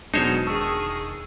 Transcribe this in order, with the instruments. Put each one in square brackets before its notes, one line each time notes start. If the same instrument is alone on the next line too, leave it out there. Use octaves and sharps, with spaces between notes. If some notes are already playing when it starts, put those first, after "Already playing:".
[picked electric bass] E1 D4 [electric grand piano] B2 F#3 G#3 [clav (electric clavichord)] D#4 C5 C#5
[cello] D#3 G#4 [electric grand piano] A5 C#6 E6